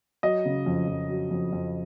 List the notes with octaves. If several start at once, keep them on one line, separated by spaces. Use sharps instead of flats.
F#3 D#5
C#3
F2
F2
F#3
F2
F2